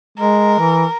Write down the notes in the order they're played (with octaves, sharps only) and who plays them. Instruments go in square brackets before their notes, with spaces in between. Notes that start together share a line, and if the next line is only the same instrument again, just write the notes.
[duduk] G#3 [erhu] A#4
[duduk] E3